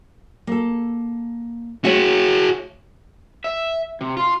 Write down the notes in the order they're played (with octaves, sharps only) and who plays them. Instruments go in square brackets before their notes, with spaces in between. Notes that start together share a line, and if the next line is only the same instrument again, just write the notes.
[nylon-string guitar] A#3 A4
[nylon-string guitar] A3 C#5 E5 [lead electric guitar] F#4 G#4
[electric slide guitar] E5
C3
F4